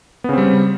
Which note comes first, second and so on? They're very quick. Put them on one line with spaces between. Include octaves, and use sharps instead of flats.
B3 C#3 C4 G3